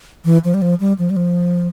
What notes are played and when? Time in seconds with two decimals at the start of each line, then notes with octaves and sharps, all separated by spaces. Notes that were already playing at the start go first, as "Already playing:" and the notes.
0.25 E3
0.44 F3
0.54 G3
0.62 F3
0.80 G3
0.99 F3
1.10 G3
1.16 F3